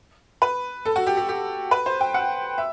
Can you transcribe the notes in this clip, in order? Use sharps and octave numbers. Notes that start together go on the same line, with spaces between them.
B4
A4
F#4
G4
G4
G4
B4
C5
G5
F#5
E5